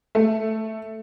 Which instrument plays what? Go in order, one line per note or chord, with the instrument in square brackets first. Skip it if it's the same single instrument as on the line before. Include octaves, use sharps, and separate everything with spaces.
[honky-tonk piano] A3